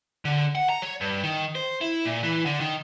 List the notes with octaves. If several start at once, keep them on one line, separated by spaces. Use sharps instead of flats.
D3
F#5
A#5
C#5
G2
D#3
C5
E4
A#2
E3
D3
D#3